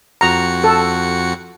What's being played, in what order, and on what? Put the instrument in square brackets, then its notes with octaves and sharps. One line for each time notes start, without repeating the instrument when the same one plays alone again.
[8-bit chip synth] F2 F#4 C#7 [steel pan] A#5
[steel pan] A4